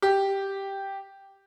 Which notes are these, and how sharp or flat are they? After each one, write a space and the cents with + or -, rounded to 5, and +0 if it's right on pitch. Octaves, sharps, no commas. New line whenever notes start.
G4 +0